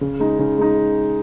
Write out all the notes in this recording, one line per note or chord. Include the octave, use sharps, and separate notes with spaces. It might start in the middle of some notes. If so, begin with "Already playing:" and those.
C#3
G#3 D#4
C#3
G#3 D#4